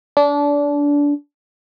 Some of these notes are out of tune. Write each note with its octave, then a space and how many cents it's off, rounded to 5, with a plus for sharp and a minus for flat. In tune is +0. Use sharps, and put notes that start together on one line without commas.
D4 -25